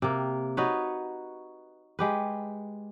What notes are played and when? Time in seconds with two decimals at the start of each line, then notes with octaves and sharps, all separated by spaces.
0.02 C3 A#3
0.57 D#4 F#4 B4 C#5
1.99 G#3 G4 B4